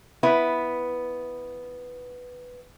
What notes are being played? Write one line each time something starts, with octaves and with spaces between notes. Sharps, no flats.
B3 E4 B4